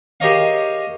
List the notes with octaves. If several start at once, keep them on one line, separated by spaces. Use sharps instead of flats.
G4 G#4 A#4 C#5 D#5 F5